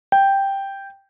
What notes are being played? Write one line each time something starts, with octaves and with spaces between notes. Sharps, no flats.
G5